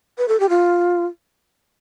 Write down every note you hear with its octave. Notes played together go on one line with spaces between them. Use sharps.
B4
A4
G4
F4